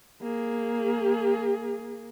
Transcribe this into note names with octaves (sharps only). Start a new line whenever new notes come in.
A#3 G#4